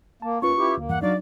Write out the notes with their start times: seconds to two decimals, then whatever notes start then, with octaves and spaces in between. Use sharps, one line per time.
0.22 A#3 A5
0.42 D#2 C#4 F4 B4 C#6
0.57 E4 G4
0.77 D2 A#3
0.89 E2 G2 E3 F#5
1.02 F#3 D4 D#4 F#4 D5 F5